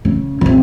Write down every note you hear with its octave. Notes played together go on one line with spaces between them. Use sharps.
C#3
C#3
C3